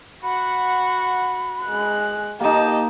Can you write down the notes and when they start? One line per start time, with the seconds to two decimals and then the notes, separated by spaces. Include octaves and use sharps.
0.23 F#4 F#5 B5
1.65 G#3 F#6
2.40 A#3 D#4 G4 D#5 A5